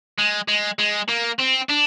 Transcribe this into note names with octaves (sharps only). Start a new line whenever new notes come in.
G#3
G#3
G#3
A#3
C4
D4